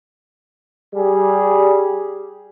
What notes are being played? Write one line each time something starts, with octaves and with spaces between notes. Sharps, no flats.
G3 G#4